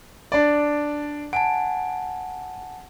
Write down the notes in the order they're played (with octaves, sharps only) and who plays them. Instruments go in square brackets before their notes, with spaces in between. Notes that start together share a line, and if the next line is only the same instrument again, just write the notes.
[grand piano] D4 D5
[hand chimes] F#5 G#5 A5 [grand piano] D7